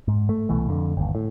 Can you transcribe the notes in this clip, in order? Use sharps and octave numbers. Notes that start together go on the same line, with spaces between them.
G#2
A3
C2 B2 E3 A3
F2 D3
G1 D#2
A2